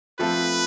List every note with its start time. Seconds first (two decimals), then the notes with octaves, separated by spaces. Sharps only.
0.19 F3 A3 C4 F4 A4 B4